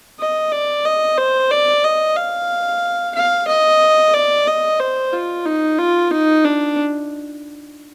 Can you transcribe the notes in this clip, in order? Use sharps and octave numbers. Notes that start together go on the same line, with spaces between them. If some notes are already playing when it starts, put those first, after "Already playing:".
D#5
D5
D#5
C5
D5
D#5
F5
F5
D#5
D5
D#5
C5
F4
D#4
F4
D#4
D4